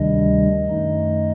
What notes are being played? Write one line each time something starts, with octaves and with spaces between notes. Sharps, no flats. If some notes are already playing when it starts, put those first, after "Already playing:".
Already playing: D2 C3 D#3 G3 D4 D#5
F#2 D#3 A3 D#4